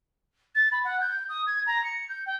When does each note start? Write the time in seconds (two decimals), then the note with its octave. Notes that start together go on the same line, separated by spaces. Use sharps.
0.55 A6
0.71 B5
0.84 F#5
1.00 G6
1.29 D#6
1.46 G#6
1.66 A#5
1.84 C#7
2.09 G6
2.26 G5